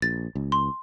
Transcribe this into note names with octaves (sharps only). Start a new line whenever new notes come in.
A#1 A6
C#2
C6